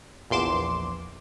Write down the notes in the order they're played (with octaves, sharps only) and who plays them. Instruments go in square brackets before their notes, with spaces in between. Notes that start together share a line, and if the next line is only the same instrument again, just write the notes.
[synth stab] A#1 E2 C6 D6 E7